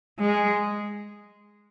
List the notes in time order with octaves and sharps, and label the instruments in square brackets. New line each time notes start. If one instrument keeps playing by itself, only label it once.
[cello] G#3